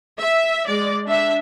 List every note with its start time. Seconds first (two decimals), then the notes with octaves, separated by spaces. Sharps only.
0.19 E5
0.68 G#3 D5
1.07 D4 E5